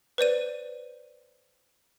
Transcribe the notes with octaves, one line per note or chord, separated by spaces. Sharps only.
B4 C5 D5 D#7